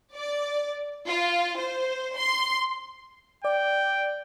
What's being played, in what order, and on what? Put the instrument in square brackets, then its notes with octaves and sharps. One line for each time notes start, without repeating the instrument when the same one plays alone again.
[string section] D5
F4
C5
C6
[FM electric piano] D5 [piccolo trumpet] G5